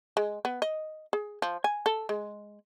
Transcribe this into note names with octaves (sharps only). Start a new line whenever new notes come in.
G#3
B3
D#5
G#4
F3
G#5
A4
G#3